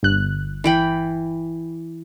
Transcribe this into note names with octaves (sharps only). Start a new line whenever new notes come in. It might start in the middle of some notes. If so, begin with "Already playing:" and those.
G1 F#6
E3 G5 B5